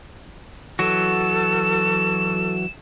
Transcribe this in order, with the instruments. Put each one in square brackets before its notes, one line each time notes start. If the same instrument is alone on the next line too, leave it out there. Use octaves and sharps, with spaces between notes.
[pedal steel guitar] E3 F#3 F#4 [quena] A4 [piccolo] E7